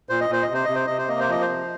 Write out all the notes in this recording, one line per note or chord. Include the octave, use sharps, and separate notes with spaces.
A#2 C5
D#5
A#2 C5
D#5
C3
C5
C3 D#5
C5
C3 D#5
C5
A#3 D#5
C5
F3 D#5
C5
C3